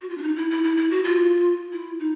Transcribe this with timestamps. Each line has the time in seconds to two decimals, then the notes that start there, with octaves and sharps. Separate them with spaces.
0.02 F#4
0.09 F4
0.18 D4
0.23 D#4
0.36 E4
0.50 E4
0.63 E4
0.77 E4
0.91 F#4
1.04 F4
1.73 E4
1.99 D#4